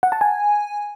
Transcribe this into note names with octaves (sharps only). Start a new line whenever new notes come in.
F#5
A5
G#5